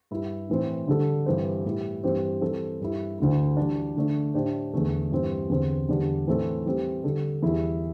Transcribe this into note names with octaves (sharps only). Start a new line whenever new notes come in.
G2 G3 E4
A2 E3 C4
D3 G3 D4 A4
G2 E3 C4 G4 C5
A2 G3 E4 G4
G2 E3 C4 G4 C5
E3 G3 C4 A4
G2 G3 E4
D2 D3 A3 E4
E3 G3 D4
D3 A3 D4
A2 A3 D4 G4 C5
E2 D3 A3
G2 E3 C4
E2 D3 C4
E2 D3 G3 D4
A2 E3 A3 C4 A4
E3 G3 C4
D3 G3 D4 A4
E2 E3 G3 E4